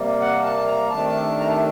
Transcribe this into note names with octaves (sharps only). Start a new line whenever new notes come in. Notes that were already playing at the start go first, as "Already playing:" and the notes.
Already playing: C3 G3 A#3
F#5
A5
A#5
C3 D#3 A3 D4 A5
A#5
A5